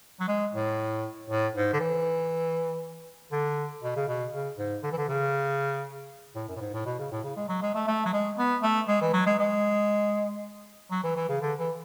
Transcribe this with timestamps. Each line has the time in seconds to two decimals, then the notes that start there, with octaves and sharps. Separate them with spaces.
0.20 F#3
0.28 G#3
0.53 A2
1.30 A2
1.55 G#2
1.73 D3
1.80 E3
3.32 D3
3.83 B2
3.96 C#3
4.08 B2
4.32 C#3
4.58 G#2
4.83 D3
4.91 E3
4.98 D3
5.08 C#3
6.35 A2
6.48 F#2
6.56 A2
6.60 G#2
6.73 A2
6.86 B2
6.99 C#3
7.12 A2
7.23 C#3
7.36 G#3
7.48 F#3
7.62 G#3
7.74 A3
7.87 A3
8.05 F#3
8.13 G#3
8.38 B3
8.63 A3
8.88 G#3
9.01 E3
9.13 F#3
9.26 G#3
9.39 G#3
10.91 F#3
11.03 E3
11.16 E3
11.29 C#3
11.41 D3
11.59 E3